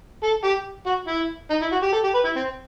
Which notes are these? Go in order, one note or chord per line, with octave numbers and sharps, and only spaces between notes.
A4
G4
F#4
E4
D#4
E4
F#4
G4
A4
G4
B4
E4
C4